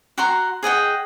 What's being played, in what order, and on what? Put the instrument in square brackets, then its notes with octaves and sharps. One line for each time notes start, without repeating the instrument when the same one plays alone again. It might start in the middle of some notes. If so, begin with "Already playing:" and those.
[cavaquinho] F#4 F#5 A#5 C6
G#4 D#5 F#5 G5